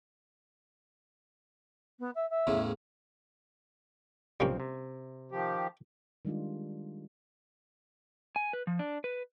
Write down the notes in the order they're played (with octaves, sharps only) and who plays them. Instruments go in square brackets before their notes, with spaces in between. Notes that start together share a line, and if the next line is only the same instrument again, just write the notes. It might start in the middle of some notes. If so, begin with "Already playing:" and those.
[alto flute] B3
E5
E5
[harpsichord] E2 A2 C#3
[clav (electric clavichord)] B1 F3 C4 [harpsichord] G3 A#3 C#4
[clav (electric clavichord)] C3
[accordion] D#3 F3 G4
[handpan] D#3 G3 G#3 D4 F4
[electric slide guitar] G#5
B4
F3
D4
B4